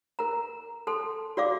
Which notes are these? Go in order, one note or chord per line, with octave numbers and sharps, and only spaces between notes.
A#4 A#5
A4 A5 C6
F#4 D5 F5 D6